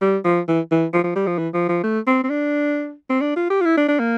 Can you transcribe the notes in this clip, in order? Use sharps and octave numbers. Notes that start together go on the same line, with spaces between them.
G3
F3
E3
E3
F3
F3
G3
F3
E3
F3
F3
A3
C4
C4
D4
C4
D4
F4
G4
F4
E4
D4
D4
A#3